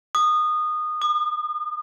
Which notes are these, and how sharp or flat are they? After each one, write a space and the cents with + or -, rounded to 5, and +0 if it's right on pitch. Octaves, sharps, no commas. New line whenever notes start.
D#6 -20
D#6 -45